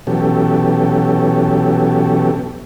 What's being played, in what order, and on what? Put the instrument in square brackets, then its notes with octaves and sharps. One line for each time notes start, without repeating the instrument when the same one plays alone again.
[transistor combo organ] B2 E3 F#3 C#4 G4 A4